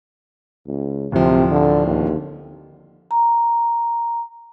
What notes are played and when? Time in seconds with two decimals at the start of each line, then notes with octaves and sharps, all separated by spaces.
0.67 C#2
1.12 D1 C3 F3
1.51 D3
1.86 D#2
3.11 A#5